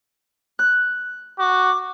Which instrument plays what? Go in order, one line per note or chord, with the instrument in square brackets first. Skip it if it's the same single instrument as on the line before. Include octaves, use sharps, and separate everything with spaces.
[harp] F#6
[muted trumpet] F#4 [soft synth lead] D6